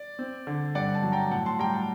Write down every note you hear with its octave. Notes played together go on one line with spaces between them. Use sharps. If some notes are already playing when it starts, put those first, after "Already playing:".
Already playing: D5
C4
D3
G2 D5 F#5
F#5 A5
F#3
G5 A#5
A2 F#5 A5
A5 C6
G3 G5 A#5
F#5 A5